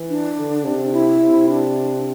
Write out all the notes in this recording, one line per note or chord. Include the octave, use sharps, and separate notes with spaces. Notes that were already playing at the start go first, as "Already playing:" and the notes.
Already playing: E3
D4
D3
C3
E4
C3
D4